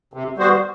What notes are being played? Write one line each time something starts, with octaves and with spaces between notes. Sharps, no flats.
C3
G3 B3 F#4 C5